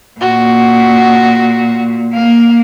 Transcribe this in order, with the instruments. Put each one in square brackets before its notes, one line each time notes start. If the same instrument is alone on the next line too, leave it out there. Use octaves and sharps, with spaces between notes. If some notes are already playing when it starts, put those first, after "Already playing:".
[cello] A#2 [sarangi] F#4
[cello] A#3 [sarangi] F5